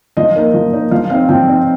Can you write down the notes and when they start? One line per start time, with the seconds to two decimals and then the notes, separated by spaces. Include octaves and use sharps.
0.17 F3 D#5
0.36 A#3 D#4
0.54 F3
0.73 A#3 D#4
0.91 F3 F5
1.10 C4 D#4 F5
1.29 F3 G5
1.48 C4 D#4